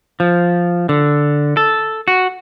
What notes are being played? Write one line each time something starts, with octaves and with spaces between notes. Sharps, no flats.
F3
D3
A4
F#4